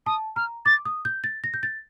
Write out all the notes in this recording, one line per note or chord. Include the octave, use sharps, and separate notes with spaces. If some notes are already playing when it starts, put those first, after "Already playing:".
A5 D#6
A#5 F6
D6 A6
D#6
G6
A6
A#6
G6
A6